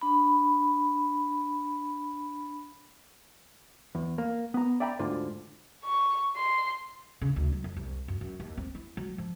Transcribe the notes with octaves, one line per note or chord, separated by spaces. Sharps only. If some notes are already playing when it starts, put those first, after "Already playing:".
D4 B5
E2
A#3
B3 A#5
D5 E5 G5 A#5 B5
D2 G#2 D3 F4
C#6
C6
C#3
D2
F#3
F2
C2
F#2
F#2
D#2
C4
E4
F#3
F3